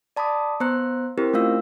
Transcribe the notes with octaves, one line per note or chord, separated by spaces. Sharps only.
D5 A5 B5 D6 D#6
B3 C5 A#5 F#6
C4 E4 G4 A#4 C5
A3 C#4 F4 F5 E6